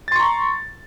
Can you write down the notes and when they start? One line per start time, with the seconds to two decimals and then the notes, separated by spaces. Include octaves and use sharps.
0.08 A6
0.12 C6
0.16 C#6
0.20 A#5